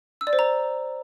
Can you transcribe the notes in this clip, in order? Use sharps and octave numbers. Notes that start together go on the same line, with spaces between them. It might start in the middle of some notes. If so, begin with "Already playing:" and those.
E6
D5
C5
A#5